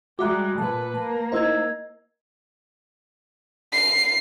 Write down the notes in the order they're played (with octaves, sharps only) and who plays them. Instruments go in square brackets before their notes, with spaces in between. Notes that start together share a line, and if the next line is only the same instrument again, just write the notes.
[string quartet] G3 G#3 [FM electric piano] F#4 E5 A#5 [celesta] D6 F#6
[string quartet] A#2 B4 [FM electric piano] A5
[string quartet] A#3 [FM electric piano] A5
[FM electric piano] D#4 E4 C5 [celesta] D#5 E6 G#6
[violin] C7